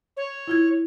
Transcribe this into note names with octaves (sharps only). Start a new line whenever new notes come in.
C#5
E4 F4 G#6